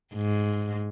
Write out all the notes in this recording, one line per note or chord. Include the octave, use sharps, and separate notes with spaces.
G#2